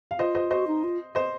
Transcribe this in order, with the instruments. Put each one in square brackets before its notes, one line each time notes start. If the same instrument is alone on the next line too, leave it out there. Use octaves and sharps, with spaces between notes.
[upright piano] F5
[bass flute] F4 [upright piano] C5 D#5
[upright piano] C5 D#5
[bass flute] F#4 [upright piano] C5 D#5
[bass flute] D#4
F4
[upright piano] C5 D#5